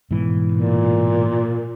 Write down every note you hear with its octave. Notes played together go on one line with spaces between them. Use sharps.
G#2 B2 E3
A#2